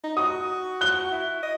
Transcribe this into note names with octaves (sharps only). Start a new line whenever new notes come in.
D#4
F#4 D#6
F#6 G7
E4
D#5